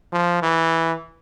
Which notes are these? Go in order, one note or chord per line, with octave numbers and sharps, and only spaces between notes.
F3
E3